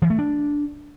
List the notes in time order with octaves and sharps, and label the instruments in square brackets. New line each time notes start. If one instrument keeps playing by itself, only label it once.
[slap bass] E3
A3
D4